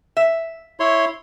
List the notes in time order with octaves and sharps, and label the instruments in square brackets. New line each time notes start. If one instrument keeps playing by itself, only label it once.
[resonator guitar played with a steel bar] E5
[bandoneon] E4 C#5 C6